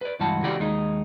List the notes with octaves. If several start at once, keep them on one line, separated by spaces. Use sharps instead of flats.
B4 D5
C#2 G2 E3 F#4 A5
C#3 E3 A3 F#4 G4 D5
D#2 G#3 D#4